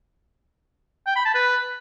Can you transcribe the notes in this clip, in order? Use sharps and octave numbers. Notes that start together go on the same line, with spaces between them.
G5
B5
A5
B4